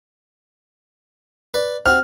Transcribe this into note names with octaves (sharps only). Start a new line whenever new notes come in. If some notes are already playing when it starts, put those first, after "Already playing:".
B4 D5
C4 F#4 F6